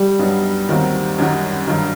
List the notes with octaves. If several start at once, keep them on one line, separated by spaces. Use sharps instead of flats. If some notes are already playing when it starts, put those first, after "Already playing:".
Already playing: G3
G2 F#3 B3 D#4
D#2 D#3 F#3 C4 F#4
F#2 D#3 G3 D#4 F#4
G2 D#3 F#3